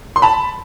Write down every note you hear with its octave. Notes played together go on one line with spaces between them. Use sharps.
C6
A5 B5